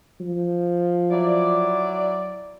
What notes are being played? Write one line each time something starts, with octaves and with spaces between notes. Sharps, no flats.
F3
F#3 E4 D5